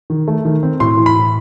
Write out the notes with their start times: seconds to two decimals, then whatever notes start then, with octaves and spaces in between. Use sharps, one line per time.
0.10 D#3
0.28 A3
0.45 D#3
0.63 C4
0.80 A2 C6
0.97 E3
1.06 B5
1.15 A2